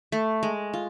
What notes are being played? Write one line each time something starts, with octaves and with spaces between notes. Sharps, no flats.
A3
G#3
F4